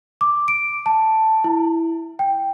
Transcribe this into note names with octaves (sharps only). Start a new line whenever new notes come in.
D6
D7
A5
E4
G5